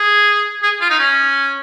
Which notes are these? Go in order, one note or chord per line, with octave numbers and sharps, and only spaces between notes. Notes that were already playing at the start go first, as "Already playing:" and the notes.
Already playing: G#4
G#4
F4
D#4
C#4